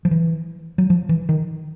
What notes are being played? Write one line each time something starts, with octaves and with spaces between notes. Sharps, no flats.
F3
E3
F#3
F3
E3
D#3